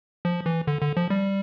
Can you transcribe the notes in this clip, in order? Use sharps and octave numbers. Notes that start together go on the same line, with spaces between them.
F3
E3
D3
D3
F3
G3